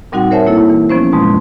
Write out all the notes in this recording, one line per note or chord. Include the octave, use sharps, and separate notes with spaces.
A#2 G3 C4 D#4 F#4 F#5
A#4 C5 C#5 E5 G#5 A5
A#3 E4 A4
E3
F3 B3 C#4 C5
F2 G#2 B2 G#3